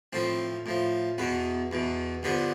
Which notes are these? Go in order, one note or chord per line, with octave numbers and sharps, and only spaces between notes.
A2 F3 C4
A2 F3
E2 B2 B3
E2 B2
G2 D3 F3 B3